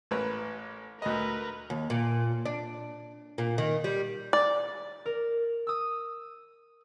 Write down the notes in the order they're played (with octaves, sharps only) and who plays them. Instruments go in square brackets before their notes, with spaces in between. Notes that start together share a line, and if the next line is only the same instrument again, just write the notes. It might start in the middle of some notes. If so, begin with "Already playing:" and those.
[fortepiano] A1 A#4 B4
[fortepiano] D2 D#5 [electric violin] A#4 B4
[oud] D#2
A#2
D4
A#2
D#3
G3
[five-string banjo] D5
[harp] A#4
D#6 E6